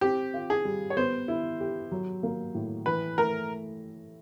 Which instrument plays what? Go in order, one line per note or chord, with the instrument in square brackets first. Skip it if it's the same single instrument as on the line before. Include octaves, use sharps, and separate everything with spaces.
[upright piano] C4 [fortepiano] G4
[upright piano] F4
[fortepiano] G#4
[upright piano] G3
[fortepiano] C#5
[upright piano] B3 [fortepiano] C5
[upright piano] E4
G4
F#3
A#3
A2
[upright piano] E3 [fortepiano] B4
[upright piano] A3 [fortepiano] A#4